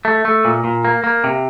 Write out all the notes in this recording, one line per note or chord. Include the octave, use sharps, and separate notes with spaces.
A3
A3
A#2
A#2
A#3
A#3
C3